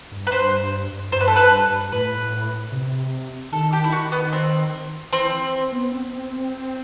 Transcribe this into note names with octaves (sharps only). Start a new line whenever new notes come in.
G2
B4
G2 C5
G2 C5
B4
A4
B4
A2 B4
C3
D#3 A4
G4
E4
F#4
B3
C4
E3 C4
B3
C4